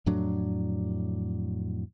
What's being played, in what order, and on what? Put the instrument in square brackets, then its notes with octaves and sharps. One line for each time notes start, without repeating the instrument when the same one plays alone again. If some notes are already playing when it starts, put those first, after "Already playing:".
[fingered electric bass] F2 A2 F#3 D4